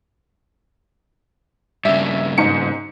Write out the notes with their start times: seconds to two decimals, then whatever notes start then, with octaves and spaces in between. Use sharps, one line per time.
1.85 G2 C#3 E5
2.38 G#2 C#7